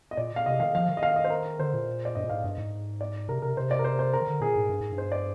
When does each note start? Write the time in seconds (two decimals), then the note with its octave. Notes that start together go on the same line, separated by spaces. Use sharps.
0.11 D#5
0.17 A#2 D5
0.36 F5
0.46 C3 D#5
0.60 D#3 F5
0.75 F3 F5
0.89 D#3
0.97 D#5
1.03 F5
1.16 D#5
1.24 C5
1.30 A#4
1.59 D3 C5
1.73 A#2
2.05 D5
2.15 G2 D#5
2.24 A#2
2.30 G#2 F5
2.44 G2 D#5
2.58 G#2
3.01 D5
3.29 C3 A#4
3.42 C3 A#4
3.57 C3 C5
3.71 D5
3.79 A#4
3.84 C5
3.99 C5
4.13 A#4
4.21 D#3
4.27 D3
4.41 A#2 G#4
4.56 G#2
4.69 G2
4.80 G#2
4.92 G2
4.98 C5
5.12 D5